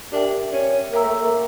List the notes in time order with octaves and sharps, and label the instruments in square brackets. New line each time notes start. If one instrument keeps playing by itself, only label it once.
[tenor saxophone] D4 [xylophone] G4 A#4 E5 G5
[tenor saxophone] C#4
[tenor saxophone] A#3 [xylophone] A#4 E5 G5 A#5 E6
[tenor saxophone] A3
A#3